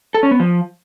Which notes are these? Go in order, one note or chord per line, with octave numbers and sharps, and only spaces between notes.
A4
C#4
B3
F3